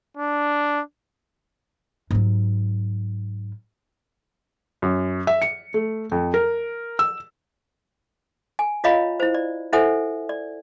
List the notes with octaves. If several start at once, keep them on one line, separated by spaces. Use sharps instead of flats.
D4
G#2 F#3
F#2
E5
C#7
A3
F2
A#4
E6
G#5
F4 C#5 D#5 F5 A#5 B5
E4 C5
D5
E4 A4 C5 E5 F#5 G#5
D5